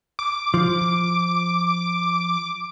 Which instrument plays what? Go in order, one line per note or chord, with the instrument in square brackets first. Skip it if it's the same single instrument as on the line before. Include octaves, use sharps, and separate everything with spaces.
[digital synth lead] D6
[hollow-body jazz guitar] F3